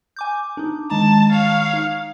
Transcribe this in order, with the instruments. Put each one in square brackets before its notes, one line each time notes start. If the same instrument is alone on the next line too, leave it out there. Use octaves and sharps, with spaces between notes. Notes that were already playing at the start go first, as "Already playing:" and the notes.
[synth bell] G#5 D6 G6
D4 D#4
[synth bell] D#3 G#3 A#5 [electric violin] A5
[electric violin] C#5 F5
[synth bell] D#4